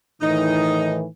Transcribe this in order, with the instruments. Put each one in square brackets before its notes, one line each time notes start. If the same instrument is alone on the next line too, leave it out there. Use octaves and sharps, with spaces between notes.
[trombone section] A2 D#3 E3 [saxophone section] D#4